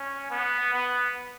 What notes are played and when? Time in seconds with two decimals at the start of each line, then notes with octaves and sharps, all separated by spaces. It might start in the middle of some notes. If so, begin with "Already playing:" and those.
Already playing: C#4
0.30 B3
0.74 B3